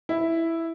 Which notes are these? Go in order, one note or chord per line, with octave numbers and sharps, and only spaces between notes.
E4